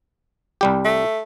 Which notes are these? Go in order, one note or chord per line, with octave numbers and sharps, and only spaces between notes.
C2 G3 G4
A3